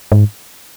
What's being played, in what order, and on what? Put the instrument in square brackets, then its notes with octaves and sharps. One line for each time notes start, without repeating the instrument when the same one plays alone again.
[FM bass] G#2